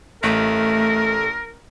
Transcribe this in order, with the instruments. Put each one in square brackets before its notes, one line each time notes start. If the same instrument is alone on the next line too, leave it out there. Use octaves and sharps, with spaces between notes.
[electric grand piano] A1 [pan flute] A3 [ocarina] A4 [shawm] A#4